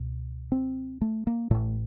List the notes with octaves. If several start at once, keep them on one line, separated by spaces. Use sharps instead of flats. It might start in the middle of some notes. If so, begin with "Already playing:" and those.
Already playing: C#2 B2
C4
A3
A#3
A1 A2 A3